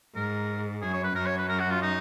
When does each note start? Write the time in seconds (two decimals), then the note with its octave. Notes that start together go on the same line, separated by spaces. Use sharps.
0.15 G#2 A#4
0.82 F#2 G#4
0.94 C#5
1.04 B4
1.15 F#2 A#4
1.26 C#5
1.38 B4
1.49 A#4
1.59 F#4
1.71 F4
1.82 D#4